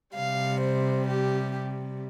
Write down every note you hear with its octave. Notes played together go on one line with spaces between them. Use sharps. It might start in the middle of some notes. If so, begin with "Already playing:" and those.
C3 G3 F5
C5
G4